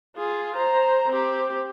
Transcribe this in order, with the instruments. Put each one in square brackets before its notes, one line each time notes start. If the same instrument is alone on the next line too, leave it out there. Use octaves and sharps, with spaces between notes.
[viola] F4 G#4
C5 A#5
C4 G4